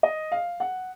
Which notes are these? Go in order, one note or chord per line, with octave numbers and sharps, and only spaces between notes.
D#5
F5
F#5